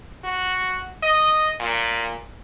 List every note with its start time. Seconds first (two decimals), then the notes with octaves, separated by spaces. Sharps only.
0.24 F#4
1.03 D#5
1.60 A#2